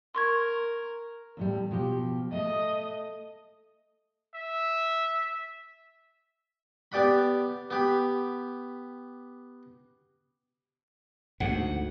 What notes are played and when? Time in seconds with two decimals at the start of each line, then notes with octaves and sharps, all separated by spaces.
0.15 A#4 C6 C#6 G#6
1.37 E2 A2 G3
1.71 B2 F3 G4
2.32 A3 D#5
4.35 E5
6.92 B3 G4 D5 F#5 B5
7.70 B3 G4 B5
11.40 D2 G#2 F#5